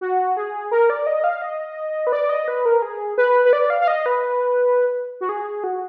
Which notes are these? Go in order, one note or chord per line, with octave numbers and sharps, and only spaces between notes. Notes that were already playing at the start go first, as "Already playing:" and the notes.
F#4
G#4
A#4
D5
D#5
F5
D#5
B4
D5
D#5
B4
A#4
G#4
B4
B4
D5
F5
F5
D#5
B4
F#4
G#4
F#4